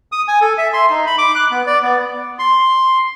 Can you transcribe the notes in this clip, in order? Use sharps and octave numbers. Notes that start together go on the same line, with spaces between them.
D#6
G#5
A4
E5
C6
D#4
B5
D6
F#6
B3
D5
B3
C6